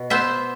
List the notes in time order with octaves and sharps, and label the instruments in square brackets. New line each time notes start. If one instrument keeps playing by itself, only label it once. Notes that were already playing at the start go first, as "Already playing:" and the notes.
Already playing: [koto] B2
B3 C5 E5